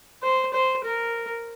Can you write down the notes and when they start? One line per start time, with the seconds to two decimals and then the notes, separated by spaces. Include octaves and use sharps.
0.23 C5
0.53 C5
0.85 A#4